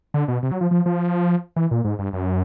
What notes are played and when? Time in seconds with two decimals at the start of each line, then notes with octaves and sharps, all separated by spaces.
0.14 D3
0.28 B2
0.43 C3
0.51 F#3
0.61 F3
0.71 F3
0.86 F3
1.56 E3
1.71 A#2
1.84 G#2
1.99 G2
2.13 F#2